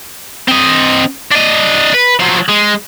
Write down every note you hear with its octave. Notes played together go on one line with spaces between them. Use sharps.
C4 D#5
D4 D#5
B4
F3 F#3
G#3